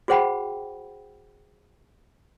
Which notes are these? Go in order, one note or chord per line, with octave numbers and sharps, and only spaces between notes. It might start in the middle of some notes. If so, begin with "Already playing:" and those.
F#4 G#4 C5 F#5 G5 B5